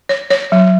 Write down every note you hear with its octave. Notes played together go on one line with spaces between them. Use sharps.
C#5
C#5
F#3